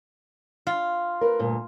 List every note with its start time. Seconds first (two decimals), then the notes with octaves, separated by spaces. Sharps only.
0.67 F4
1.21 A#4 B4
1.39 D2 G2 A#2